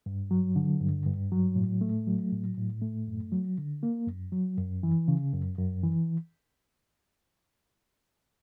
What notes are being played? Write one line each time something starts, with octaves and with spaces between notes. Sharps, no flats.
G2
F#3
D3
G2
G2
F#3
A2
A3
F#3
A2
A2
A3
F#2
F#3
D3
A#3
F#2
F#3
F#2
E3
C#3
F#2
F#2
E3